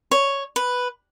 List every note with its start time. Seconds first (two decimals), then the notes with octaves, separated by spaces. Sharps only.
0.11 C#5
0.56 B4